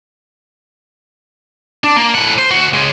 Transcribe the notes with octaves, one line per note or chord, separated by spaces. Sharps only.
D4
A#3
A2 F#5
C5
D2 F#4
C#3 G#3